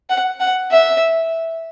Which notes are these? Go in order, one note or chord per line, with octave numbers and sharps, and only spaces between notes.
F#5
F#5
E5